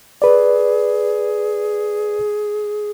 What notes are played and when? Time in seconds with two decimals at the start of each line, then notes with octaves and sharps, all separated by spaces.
0.22 G#4 B4 D5